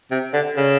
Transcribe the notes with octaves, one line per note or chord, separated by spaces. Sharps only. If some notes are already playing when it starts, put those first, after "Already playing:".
C3
D3
C#3